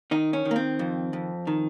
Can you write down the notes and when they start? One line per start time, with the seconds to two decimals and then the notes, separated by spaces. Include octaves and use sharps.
0.11 D#3 D#4
0.33 C#4
0.45 D#3
0.51 A#3
0.56 C4
0.79 F2
1.13 F2
1.47 D#3